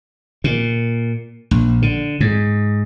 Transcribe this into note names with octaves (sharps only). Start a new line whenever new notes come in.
A#2
A#1
D3
G#2